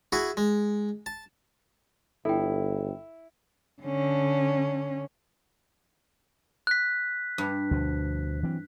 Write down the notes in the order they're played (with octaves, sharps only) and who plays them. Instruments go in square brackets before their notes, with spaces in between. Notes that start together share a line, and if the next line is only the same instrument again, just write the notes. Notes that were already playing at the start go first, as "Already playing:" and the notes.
[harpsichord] E4 F#4 G#4
G#3
A5
[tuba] G1 [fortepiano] E4 [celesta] A4 G5
[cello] D3 C#4
[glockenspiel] F#6 B6
[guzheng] G2
[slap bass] D2 B2 F3
E3 F#3 C4